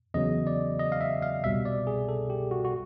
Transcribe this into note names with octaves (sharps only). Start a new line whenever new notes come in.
E2 C#3 F#3 D#5
D5
D#5
F5
E5
F5
C2 B2 G3 E5
D5
G#4
A4
G4
F#4
F#4